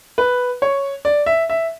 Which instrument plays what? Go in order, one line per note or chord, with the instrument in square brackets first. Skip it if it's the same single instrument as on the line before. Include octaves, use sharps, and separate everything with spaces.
[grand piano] B4
C#5
D5
E5
E5